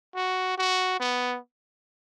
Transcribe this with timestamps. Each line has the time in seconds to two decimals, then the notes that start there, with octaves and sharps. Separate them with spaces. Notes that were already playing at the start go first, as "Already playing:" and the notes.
0.15 F#4
0.58 F#4
1.00 B3